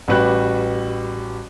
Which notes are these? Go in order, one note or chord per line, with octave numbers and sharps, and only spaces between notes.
A1 G3 F#4 B4 G5 F#6